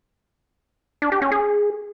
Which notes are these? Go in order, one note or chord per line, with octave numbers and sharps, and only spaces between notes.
D4
G4
C#4
G#4